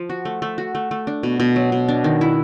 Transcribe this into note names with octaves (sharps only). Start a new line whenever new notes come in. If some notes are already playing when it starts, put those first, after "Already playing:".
Already playing: F3
F#4
A3
A3
F#4
A3
A3
D4
B2
B2
F#3
B2
D4
D#3
E4